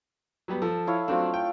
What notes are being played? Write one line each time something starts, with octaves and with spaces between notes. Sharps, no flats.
F#3 G3 B3
F3 A4
E4 C#5 F5
F#3 A3 C4 D4 F4
G5